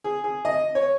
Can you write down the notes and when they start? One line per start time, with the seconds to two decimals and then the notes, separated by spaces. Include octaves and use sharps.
0.04 G#4
0.24 G#4
0.45 D#5
0.75 C#5